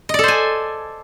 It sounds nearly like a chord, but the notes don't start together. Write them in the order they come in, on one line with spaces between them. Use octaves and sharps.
D#5 D5 A4 C5 G#5